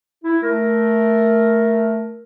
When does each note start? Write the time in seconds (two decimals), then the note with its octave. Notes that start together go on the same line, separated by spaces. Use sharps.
0.24 E4
0.43 A3 A#4